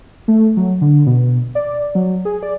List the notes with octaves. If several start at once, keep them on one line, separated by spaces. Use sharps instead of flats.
A3
F#3
D3
B2
D5
F#3
G#4
D5